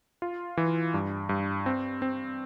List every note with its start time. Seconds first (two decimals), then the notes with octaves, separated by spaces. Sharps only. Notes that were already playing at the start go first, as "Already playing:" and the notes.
0.22 F4
0.57 E3
0.94 G2
1.29 G2
1.66 C4
2.02 C4